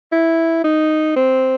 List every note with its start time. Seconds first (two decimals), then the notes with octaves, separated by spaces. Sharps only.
0.12 E4
0.64 D#4
1.16 C4